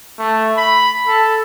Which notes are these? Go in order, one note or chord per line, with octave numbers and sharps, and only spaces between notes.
A3
B5
A4